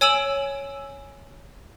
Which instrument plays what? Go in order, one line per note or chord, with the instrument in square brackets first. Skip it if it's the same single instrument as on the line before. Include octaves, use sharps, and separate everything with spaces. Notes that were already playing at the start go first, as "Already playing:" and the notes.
[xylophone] C#5 G#5 E6 D7 E7 F#7